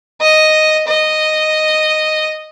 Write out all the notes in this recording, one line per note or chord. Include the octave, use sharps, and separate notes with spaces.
D#5
D#5